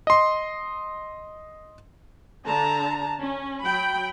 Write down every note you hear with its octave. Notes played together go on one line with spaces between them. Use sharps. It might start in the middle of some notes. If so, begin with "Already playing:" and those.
D#5 C6
D3 A5 A#5
C#4
F#3 G5 B5